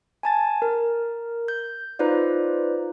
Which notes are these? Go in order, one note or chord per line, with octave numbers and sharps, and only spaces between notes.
G#5 A5 A6
A#4
G6
D#4 F4 B4 C5 D5